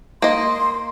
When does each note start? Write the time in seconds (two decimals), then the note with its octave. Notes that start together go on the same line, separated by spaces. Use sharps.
0.22 A#3 D#5 C6